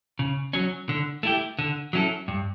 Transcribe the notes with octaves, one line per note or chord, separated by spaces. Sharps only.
C#3
F#3 C#4
D3
A3 E4 G4
D3
F#3 C#4 E4 A4
G2